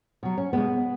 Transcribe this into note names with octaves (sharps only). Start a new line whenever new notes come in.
B2 F#3
C#4
B2 G#3 B3